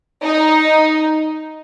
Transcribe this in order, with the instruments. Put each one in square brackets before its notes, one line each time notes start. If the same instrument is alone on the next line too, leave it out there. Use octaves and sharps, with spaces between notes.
[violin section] D#4